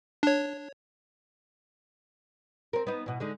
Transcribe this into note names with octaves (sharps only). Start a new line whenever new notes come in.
D4 C#5
C4 A#4
B3 D#4
B2 E3
D3 G#3 D#4